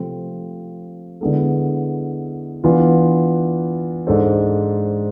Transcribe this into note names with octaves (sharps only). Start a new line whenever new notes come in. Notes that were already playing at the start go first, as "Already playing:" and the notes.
Already playing: C3 F3 A3 C4
D3 G#3 B3 E4 A4
E3 B3 D4 F4 B4
G#2 G#3 D4 A4 C5